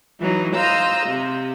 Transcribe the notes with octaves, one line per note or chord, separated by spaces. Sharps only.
E3 F#3 D#4
C5 D#5 F5 A#5 E6
C3